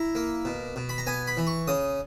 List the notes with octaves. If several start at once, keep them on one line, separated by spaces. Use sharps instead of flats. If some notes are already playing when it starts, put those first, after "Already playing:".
Already playing: E4 A#5
A#3
B2
B2
B5
A#5
B3 G#5
B5
E3
C#6
C#3 D#6